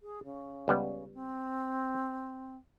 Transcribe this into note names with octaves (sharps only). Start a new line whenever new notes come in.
G#4
C#3
C#2 G3 B3
C4